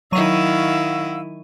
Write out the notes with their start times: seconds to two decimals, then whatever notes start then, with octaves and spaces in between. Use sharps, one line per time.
0.12 D#3 F#3 E4 F5 F#5 C#6 E6 D#7